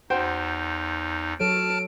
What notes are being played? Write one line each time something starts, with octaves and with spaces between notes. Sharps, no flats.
E2 D#4 F#4 C5 G5
F#3 A4 C#5 A5 F6 D7